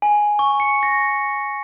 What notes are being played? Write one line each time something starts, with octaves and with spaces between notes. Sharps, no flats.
G#5
C#6
C#7
A#6